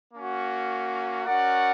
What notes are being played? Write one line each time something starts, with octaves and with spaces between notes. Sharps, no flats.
A#3 C#4 F#4
C#4 F#4 A#4 D5 F#5